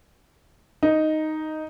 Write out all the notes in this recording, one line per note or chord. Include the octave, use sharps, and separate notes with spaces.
D#4